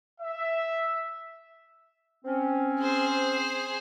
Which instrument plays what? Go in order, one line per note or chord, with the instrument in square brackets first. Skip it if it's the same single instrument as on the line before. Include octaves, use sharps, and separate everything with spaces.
[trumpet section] E5
[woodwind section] C4 C#4
[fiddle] G#4 C5